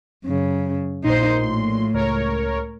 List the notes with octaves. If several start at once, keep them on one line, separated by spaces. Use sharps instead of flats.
F#2 C#3
A#1 A#2 D#4 C5 C6
A2
C#2 A#4 C#5